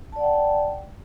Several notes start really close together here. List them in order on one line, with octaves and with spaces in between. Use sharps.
A5 D5 F#5 G5